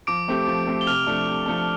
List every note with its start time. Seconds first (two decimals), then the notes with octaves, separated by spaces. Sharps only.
0.07 F3 D6 D7
0.28 A3 C4 G4
0.47 F3
0.67 A3 C4 G4
0.81 G7
0.87 C3 F6 F7
1.07 F3 A3 D4 A4
1.27 C3
1.46 F3 A3 D4 A4